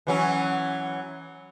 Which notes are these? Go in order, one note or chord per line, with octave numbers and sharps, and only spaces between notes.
E3 F#3 C#4